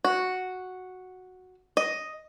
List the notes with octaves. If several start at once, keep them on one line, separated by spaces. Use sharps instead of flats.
F#4
D#5